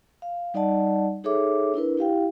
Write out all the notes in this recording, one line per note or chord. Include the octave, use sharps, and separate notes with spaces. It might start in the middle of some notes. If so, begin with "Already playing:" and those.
F5
G3 D#4 D5 D#5 F#5 A5
D#4 G#4 A4 C#5 E5 D6
D4 E4 A#4 B4
E4 G4 F5 G5